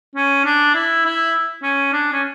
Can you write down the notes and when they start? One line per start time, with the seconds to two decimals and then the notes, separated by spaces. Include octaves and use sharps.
0.15 C#4
0.45 D4
0.74 E4
1.05 E4
1.63 C#4
1.93 D4
2.12 C#4